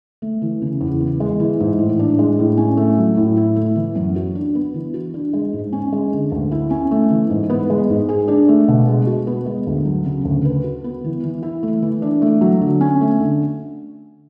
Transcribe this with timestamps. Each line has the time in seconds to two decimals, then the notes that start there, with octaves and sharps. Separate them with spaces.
0.22 A3
0.42 E3
0.62 C#3
0.81 E2
1.00 B3
1.20 G#3
1.40 E3
1.60 G#2
1.79 A2
1.99 D4
2.19 G#3
2.39 A2
2.57 C#4
2.77 A3
2.98 F#3
3.17 A2
3.37 E4
3.56 A3
3.76 E3
3.95 F#2
4.16 F#4
4.35 D4
4.55 B3
4.74 E3
4.94 F#4
5.14 D4
5.33 G#3
5.53 G#2
5.73 C#4
5.92 G#3
6.12 D3
6.32 D2
6.51 E4
6.70 C#4
6.91 A3
7.10 E3
7.30 G#2
7.50 B3
7.70 G#3
7.90 G#2
8.09 G#4
8.28 D4
8.48 A3
8.68 B2
8.88 G#3
9.07 F#4
9.27 B3
9.46 G#3
9.67 D2
9.85 F#3
10.06 C#3
10.25 D2
10.45 B4
10.64 F#4
10.84 B3
11.04 E3
11.23 E3
11.43 E4
11.63 A3
11.82 E3
12.02 D4
12.22 A3
12.41 F#3
12.61 D3
12.81 C#4
13.01 A3
13.20 D3